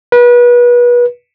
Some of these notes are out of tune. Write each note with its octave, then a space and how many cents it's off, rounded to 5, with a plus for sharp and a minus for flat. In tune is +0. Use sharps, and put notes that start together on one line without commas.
B4 -30